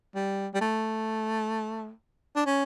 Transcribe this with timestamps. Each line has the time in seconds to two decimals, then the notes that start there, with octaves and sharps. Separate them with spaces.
0.15 G3
0.54 G3
0.61 A3
2.36 D4
2.46 C#4